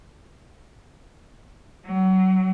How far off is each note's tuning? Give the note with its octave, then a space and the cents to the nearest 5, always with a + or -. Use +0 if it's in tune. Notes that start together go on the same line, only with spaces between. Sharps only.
F#3 +30